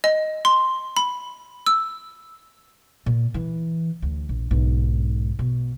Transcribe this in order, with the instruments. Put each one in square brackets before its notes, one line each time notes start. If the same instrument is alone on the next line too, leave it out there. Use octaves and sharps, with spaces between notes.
[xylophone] D#5
C6
B5
E6
[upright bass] A#2
E3
D2
A#1
B1 G#2
B2